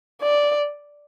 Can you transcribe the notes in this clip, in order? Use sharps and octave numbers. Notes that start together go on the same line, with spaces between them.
D5